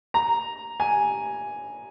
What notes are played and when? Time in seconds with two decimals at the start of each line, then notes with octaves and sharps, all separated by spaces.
0.14 A#5
0.80 G#5